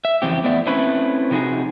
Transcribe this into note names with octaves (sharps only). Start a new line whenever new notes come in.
E5
F2 C#3 E3 C4 G4
E2 A2 B3 D5 E5
A3 C4 C#4 E4 B4
C3 F3 D#4 E4 F#4 G#4